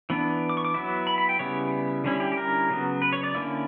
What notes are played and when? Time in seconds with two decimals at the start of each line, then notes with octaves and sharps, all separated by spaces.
0.10 E3 B3 D4
0.49 D6
0.57 C#6
0.65 D6
0.74 F#3 B3 E4
1.07 B5
1.18 B5
1.29 G5
1.39 C#3 G3 B3 E4 C#5
2.04 D3 G3 C#4 E4
2.20 G4
2.32 G4
2.37 A#4
2.70 C#3 F#3 B3
3.02 B4
3.13 C#5
3.24 D5
3.35 D3 A#3 C#4 E4